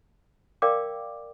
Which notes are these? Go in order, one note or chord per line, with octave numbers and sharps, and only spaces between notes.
A#4 D5 F5 G5 D6